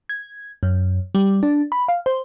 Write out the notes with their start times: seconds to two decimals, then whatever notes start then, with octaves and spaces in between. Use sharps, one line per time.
0.09 G#6
0.63 F#2
1.15 G3
1.43 D4
1.72 B5
1.88 F5
2.06 C5